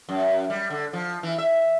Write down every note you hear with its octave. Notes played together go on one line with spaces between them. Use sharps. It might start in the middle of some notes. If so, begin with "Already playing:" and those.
F#2
G3
D3
F3
E3
E5